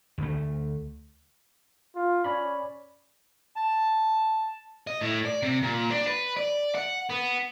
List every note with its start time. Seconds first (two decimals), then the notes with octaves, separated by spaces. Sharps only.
0.18 D2 A3
1.95 F4
2.24 C#4 C#5 D5 B5
3.56 A5
4.87 D#5
5.01 A2
5.25 D5
5.42 C3
5.63 A#2
5.91 D4
6.07 B4
6.37 D5
6.75 F#5
7.11 B3